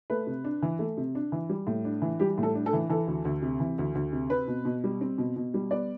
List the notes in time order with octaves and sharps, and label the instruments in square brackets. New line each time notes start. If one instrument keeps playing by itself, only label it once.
[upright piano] A3 B4
C3
D4
E3
A3
C3
D4
E3
G3
A2
D4
E3
G3 G4
A2
A4
D4
A4
E3
E3 A4
D2
D2
C3
E3
D2
D2
C3
C4 B4
B2
B2
G3
C4
B2
B2
G3
B3 D5